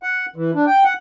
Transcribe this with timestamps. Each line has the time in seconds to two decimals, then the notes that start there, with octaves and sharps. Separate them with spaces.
0.03 F#5
0.36 E3
0.55 D4
0.67 G5
0.84 F#5